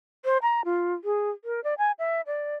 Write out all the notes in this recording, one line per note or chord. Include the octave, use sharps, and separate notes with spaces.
C5
A#5
F4
G#4
A#4
D5
G#5
E5
D5